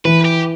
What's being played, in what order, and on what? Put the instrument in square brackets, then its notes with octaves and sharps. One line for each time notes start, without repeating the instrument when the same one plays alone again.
[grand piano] E3 [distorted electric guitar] B4
[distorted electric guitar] G4